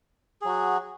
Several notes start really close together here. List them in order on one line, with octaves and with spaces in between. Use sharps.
G#4 F#3 F#4